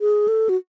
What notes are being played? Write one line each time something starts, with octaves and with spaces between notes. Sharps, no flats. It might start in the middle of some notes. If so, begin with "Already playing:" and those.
G#4
A4
F#4